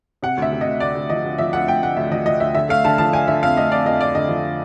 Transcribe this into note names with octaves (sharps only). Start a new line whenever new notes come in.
C3 F#5
D2 E5
C3
D#5
D2
D2 D5
D2
F3 D#5
D2
F3 E5
D2 F#5
D2 G5
D2 F#5
D2 E5
F3 D#5
F3 D#5
D2 E5
D3 E5
A3 F5
D3 A5
F3 A5
D3 G#5
D3 E5
F2 F5
A3 D#5
F2 D5
F2 D#5
A3 D5
D3 D#5
F3